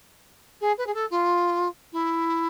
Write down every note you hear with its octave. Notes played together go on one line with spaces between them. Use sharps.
G#4
B4
G#4
A4
F4
E4